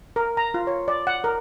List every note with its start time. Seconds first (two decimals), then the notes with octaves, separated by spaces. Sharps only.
0.16 A#4
0.37 A#5
0.54 F4
0.67 C#5
0.88 D5
1.07 F#5
1.24 A#4